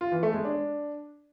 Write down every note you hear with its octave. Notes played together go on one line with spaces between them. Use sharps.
F4
E3
A3
G#3
D4